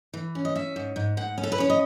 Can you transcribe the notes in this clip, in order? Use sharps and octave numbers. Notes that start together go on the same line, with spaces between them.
E3
C#4
D#5
C#4 E5
G#2
G#2
G#2 F#5
C#4
A4
B4
C#4 C#5
D#5